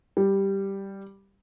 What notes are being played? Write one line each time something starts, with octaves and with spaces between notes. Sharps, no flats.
G3